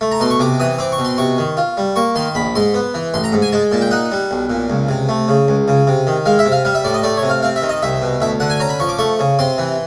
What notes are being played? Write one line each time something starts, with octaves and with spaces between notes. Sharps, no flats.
A3
A#5
B2 C6
C#6
C3 D6
E3 D#6
C4 D6
C#6
B2
C6
C3 C#6
D#3
F4
G3
A#3 C#6
D#3 C6
A#1 B5
G#2 C6
B3
E3
A1 C6
A#5
G#2
G#5
G#3 A5
A#2 A5
G5
D#4 F#5
G3
B1
A#2
C#2
C3
A3
C#3
C#2
C#3
C3
D#3
G#3 F5
E5
C3
F5
G3 F5
E5
A2 D5
D#5
A3 D5
C#5
C3
F5
C4 F5
E5
D#3
D#5
C2 E5
B2
D2 E5
D3 F#5
G#5
C#4 A#5
B5
F3 C#6
D6
A3 C#6
C#3
C3 C6
E3